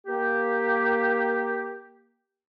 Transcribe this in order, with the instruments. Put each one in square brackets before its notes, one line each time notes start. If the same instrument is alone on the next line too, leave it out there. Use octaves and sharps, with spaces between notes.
[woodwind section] A#3 G4